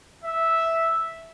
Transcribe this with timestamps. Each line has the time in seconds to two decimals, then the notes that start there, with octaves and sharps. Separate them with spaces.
0.24 E5